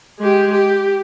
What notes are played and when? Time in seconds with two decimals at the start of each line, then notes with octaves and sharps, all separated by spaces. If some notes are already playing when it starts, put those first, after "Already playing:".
0.19 G#3 G4
0.53 G4